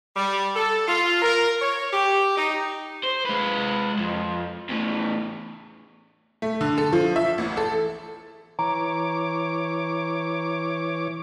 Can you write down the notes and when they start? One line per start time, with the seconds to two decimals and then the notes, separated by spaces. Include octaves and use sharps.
0.16 G3
0.55 A4
0.88 F4
1.22 A#4
1.61 C#5
1.93 G4
2.37 D#4
3.03 C5
3.25 G#3 B4
3.99 F2
4.69 E2 A2
6.42 A3
6.61 D3
6.78 A4
6.93 F3
7.16 E5
7.38 A1
7.57 A4
8.59 E3 C#5 A#5 D6